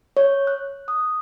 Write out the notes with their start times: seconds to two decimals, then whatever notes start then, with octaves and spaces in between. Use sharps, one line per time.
0.17 C#5
0.47 F#6
0.88 D#6